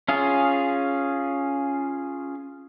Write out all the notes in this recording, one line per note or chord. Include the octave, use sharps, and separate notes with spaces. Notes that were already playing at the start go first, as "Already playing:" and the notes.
C#4 F4 G#4 F5